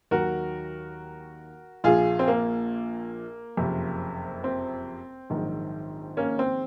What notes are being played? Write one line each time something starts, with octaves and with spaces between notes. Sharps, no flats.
D#2 D#3 F#3 F#4 A#4
A#1 A#2 F3 F4 G#4
C4
A#3
F#1 F2 C3
C4
A#1 G#2 D#3 F#3
A#3 C#4
C4